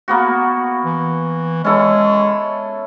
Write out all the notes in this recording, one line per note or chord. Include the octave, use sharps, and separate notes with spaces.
A#3 B3 F#4
E3
G#3 C#4 E4 A4